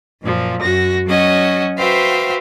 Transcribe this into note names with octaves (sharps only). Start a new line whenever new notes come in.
F#2 A#2 F3
F#2 F#4 A#6
F#3 C#4 F#4 D#5
F#4 B4 C5 E5 F5 G5